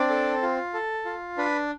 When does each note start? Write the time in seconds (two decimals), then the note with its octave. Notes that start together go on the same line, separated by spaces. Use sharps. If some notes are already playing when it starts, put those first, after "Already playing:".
Already playing: C4 D4 D5
0.09 A4
0.42 F4
0.74 A4
1.05 F4
1.38 D4 B4